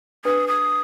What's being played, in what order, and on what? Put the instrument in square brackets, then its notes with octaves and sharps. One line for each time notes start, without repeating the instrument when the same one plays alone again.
[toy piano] D4 B4 [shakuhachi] D#6
[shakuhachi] D#6